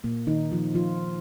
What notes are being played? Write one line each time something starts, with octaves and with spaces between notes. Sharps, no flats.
A#2 A#3
D#3 D#4
F3 F4
F3 F4